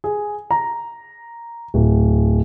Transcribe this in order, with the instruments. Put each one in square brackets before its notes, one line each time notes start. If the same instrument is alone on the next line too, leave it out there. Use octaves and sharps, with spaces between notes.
[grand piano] G#4
A#5
D1